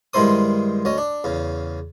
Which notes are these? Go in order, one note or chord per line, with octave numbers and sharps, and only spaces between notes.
G2 D#3 G#3 E4 C5 D#6
D2 C#4 D#5
D4
E2 C#3